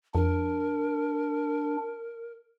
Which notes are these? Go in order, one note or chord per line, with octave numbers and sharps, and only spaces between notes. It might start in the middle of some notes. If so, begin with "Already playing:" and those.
F2 D4 A#4